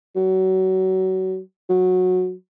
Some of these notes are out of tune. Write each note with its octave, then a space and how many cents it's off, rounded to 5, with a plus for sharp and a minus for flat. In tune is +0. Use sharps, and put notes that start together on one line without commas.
F#3 +25
F#3 -15